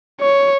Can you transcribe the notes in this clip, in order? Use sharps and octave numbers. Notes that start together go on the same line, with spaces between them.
C#5